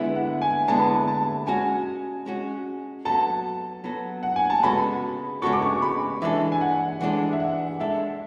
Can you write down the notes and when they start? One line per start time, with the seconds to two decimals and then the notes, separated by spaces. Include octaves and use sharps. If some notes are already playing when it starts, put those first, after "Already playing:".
Already playing: D3 G#3 B3 E4 E5
0.15 F#5
0.42 G#5
0.68 D3 G#3 B3 E4 A5
0.79 B5
0.91 A5
1.08 A5
1.47 G#3 C#4 F#4 G#5
2.26 G#3 C#4 F#4
3.05 F#3 B3 F#4 A4 A5
3.84 F#3 B3 F#4 A4
4.23 F#5
4.36 G#5
4.50 A5
4.63 C#3 G#3 B3 F#4 A4 B5
5.42 C#3 G#3 B3 F#4 A4 C#6
5.53 D6
5.62 C#6
5.82 B5
6.22 E3 G#3 D4 A4 E5
6.52 G#5
6.61 F#5
7.00 E3 G#3 D4 A4 F#5
7.33 E5
7.40 F#5
7.80 G#3 D4 A4 E5